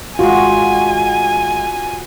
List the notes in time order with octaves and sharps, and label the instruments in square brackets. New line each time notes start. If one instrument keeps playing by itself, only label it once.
[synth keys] G#1 G#3 [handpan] F4 F#4 [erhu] G#5